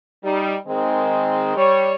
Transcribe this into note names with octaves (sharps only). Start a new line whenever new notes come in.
G3 D#4
D#3 G#3 C4
G3 C#5